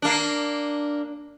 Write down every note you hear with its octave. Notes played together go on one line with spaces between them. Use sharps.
A#3 D4